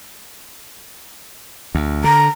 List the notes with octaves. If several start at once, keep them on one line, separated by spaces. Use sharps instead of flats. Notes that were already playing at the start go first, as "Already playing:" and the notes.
D2
D3 A#5